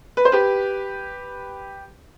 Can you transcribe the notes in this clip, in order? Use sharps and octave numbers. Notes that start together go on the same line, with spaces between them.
B4
C5
G4 B4